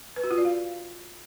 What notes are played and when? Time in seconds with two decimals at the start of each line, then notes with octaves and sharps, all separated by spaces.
0.16 B4
0.24 F#4
0.31 F4
0.38 D5
0.45 F5